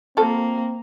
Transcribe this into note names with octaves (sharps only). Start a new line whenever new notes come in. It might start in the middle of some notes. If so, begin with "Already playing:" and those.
F3 A#3 C4 A4